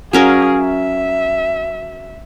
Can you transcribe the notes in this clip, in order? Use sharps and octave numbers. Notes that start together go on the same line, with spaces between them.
F#3 C#4 G#4 A#4 F5
E5